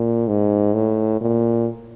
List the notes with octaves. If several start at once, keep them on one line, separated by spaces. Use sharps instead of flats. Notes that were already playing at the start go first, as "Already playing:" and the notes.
Already playing: A#2
G#2
A2
A#2